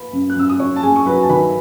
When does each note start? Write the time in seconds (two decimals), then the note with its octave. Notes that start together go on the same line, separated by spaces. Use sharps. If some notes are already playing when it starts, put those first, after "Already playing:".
Already playing: B4 B5
0.13 F#2
0.30 F#6
0.36 F#2 E6
0.49 D#6
0.60 F#2 C#5 C#6
0.76 A5
0.83 F#2 G#4 G#5
0.96 C#6
1.06 F#3 B4 B5
1.23 A5
1.29 D#3 B4 B5